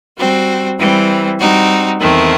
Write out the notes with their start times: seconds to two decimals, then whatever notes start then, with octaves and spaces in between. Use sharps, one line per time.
0.17 G3 C4 F#4
0.78 E3 G3 C4
1.39 G3 C4 D#4 F#4
2.00 E2 D#3 A3 C4